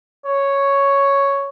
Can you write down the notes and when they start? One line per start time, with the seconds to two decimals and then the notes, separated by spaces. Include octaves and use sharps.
0.25 C#5